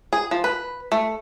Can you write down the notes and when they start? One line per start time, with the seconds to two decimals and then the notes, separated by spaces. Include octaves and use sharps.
0.13 G#4
0.31 F3
0.44 B4
0.92 A3